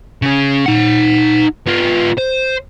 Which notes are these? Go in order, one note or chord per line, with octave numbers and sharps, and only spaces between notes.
C#3 C#4
D#4 F#5
B3 F4
C5